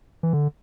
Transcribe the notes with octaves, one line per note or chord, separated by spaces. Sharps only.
E3
D3